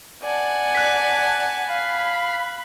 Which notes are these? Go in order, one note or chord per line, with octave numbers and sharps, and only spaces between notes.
D5 F#5 G#5 A5
F#6 B6
F5 B5